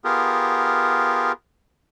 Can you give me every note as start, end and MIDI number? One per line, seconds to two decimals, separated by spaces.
0.04 1.32 59
0.04 1.32 65
0.04 1.32 67
0.04 1.32 68
0.04 1.32 70